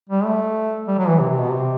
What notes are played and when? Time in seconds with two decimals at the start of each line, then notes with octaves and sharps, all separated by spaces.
0.09 G3
0.25 A3
0.87 G3
0.98 F#3
1.08 E3
1.19 C3
1.30 C3
1.40 B2
1.51 C3